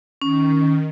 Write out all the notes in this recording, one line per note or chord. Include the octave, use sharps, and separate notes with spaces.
D#3 C#4